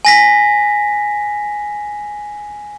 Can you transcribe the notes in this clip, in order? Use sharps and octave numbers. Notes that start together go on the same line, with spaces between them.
G#5 A#6 B6